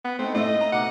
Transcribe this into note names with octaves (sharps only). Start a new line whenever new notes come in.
B3
A3 C4 D#4
A2 A3 D#5 E5
A#5
B2 F#5 D6